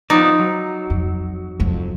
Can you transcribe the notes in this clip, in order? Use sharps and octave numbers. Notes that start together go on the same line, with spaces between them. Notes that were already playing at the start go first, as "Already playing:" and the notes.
F3 B3 D#4 D5
F#3
F2
C2 F2